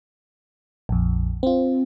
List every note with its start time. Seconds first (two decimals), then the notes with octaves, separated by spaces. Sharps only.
0.89 A#1 F2
1.43 C4 F4